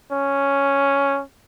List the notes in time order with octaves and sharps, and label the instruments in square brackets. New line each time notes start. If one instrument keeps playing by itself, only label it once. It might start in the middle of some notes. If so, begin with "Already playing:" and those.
[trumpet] C#4